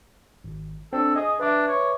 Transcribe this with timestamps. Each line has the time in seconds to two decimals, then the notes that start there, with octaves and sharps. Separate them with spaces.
0.44 G#1
0.93 C4 D4 A4
1.15 G#4 D#5 D#6
1.40 D4 B4 E5 D6
1.68 C#5